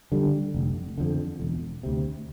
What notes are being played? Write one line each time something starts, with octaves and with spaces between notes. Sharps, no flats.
D3 G3
F1
F2 D3
E1
D2 C3